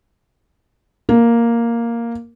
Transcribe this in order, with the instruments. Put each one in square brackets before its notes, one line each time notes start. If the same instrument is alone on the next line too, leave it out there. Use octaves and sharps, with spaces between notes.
[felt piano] A#3